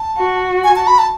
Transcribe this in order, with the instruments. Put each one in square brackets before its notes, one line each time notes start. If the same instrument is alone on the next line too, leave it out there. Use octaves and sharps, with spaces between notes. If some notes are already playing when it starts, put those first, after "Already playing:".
Already playing: [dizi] A5
[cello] F#4
[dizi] G#5
A5
B5
A5